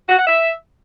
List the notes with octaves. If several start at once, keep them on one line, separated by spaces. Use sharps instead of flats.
F#4
F#5
E5